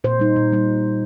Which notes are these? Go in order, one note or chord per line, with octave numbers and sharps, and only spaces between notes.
A#2 C5
G3 D#4
A#2
G3 D#4